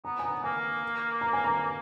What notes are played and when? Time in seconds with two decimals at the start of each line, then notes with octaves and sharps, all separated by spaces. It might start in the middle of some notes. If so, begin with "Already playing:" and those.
0.05 B3 A#5
0.19 G#5
0.24 B3 A#5
0.44 A#3 G#5
1.21 A#5
1.33 G#5
1.44 A#5